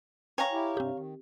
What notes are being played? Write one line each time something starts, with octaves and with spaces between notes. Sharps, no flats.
C#5 F5 G5 G#5 A#5
E4 G4
G2 C3 C4 G4
D#3